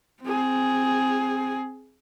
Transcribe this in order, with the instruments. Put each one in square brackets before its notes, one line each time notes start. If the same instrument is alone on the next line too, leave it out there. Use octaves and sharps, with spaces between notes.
[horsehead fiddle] C4 G#4